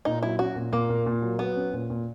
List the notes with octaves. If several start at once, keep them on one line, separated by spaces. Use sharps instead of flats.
A#2 D#4
F#3 E4
C#4 F#4
A#2
A#2 A#3
A#2
A#2
F#3
F#3 B3
C#4
A#2
A#2